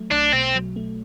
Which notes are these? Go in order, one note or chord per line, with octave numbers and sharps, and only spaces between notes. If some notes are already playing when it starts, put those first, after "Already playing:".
Already playing: F#3 A3
B1 D4
B2 C4
F#3
A3